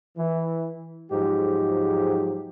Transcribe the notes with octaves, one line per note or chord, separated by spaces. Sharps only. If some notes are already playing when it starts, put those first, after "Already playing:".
E3
G#2 F3 F#3 G#3 G4